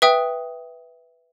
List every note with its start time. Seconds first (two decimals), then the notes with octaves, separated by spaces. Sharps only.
0.02 B4 E5 G5 D#6